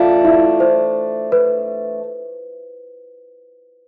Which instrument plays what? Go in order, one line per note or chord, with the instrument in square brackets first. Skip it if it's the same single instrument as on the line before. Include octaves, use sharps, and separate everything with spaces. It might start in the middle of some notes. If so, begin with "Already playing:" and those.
Already playing: [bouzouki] E3 A3 D4 [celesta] F4 F5
[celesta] E4 E5
C5
B4